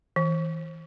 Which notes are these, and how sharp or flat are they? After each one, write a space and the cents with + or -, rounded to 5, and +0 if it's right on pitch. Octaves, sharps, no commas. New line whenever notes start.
E3 -30